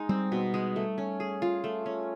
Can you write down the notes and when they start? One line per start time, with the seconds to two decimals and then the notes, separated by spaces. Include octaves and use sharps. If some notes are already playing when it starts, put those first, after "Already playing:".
Already playing: G#3 D#4
0.09 G3 C4
0.32 B2
0.54 G#3
0.76 A3
0.98 C#4
1.20 G#4
1.42 F4
1.64 A3
1.86 C#4